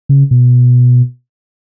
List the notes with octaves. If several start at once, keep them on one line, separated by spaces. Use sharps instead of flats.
C#3
B2